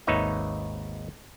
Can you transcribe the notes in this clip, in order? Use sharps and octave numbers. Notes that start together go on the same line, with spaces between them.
G#1 D#2 D#4 B4 C#5 E5